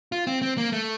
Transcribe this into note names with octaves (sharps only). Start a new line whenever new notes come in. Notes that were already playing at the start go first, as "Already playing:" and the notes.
F4
C4
C4
A#3
A3